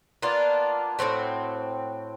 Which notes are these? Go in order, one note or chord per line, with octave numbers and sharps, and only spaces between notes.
A#3 B3 D4 F4
A2 C3 C4 F#4